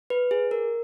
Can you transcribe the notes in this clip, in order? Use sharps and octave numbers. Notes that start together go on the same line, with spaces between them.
B4
G#4
A#4